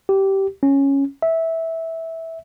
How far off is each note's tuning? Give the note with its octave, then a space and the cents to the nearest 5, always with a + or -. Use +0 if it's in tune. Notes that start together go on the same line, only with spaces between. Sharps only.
G4 -15
C#4 -5
E5 -15